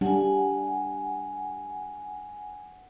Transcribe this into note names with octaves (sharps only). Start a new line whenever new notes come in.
G3 D4 F#5 G#5